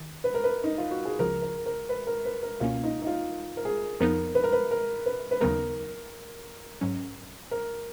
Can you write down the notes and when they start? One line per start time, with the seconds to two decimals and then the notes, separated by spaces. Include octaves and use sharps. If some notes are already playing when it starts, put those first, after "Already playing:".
Already playing: D#3
0.24 B4
0.34 A#4
0.44 B4
0.64 D#4
0.78 F4
0.91 F#4
1.05 G#4
1.19 C#2 C#3 F3 A#4
1.42 A#4
1.66 A#4
1.89 B4
2.07 A#4
2.25 B4
2.43 A#4
2.60 C#2 B2 A#3 C#4 F4
2.83 D#4
3.02 D#4
3.07 F4
3.57 A#4
3.65 G#4
4.00 F2 F3 B3 D#4 A#4
4.35 B4
4.44 A#4
4.52 B4
4.71 A#4
5.06 B4
5.31 B4
5.41 D#2 C#3 F#3 B3 D#4 A#4
6.81 G#2 F#3 C#4
7.51 A#4